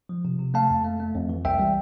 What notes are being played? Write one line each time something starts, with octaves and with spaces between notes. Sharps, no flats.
F3
C3
C3
A3 F5 A5
F2
A3
A3
F2
E3
C2 E5 G5
G3